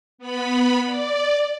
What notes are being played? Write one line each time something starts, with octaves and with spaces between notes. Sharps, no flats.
B3 B5
D5